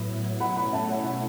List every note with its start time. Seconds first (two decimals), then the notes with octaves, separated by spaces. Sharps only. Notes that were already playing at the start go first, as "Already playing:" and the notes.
Already playing: A2 F#3 B3 E4
0.40 B2 A3 C#4 E4 F#5 B5
0.56 F#5 B5
0.72 E5 A5
0.89 C#5 F#5
1.04 F#5